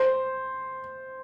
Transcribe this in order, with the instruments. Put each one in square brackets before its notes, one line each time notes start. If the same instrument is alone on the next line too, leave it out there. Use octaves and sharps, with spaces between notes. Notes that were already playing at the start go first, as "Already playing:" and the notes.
Already playing: [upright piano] C5